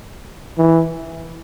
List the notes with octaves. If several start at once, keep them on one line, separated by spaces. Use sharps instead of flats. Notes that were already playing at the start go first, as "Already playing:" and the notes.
E3